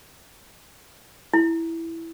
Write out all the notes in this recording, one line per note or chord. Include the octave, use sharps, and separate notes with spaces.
E4